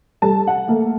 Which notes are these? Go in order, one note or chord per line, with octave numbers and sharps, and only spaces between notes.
G3 A4 A5
F#5
A3 A#3 A4